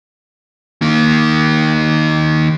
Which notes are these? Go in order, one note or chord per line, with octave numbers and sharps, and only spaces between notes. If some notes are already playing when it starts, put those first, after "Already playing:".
D#3 A#3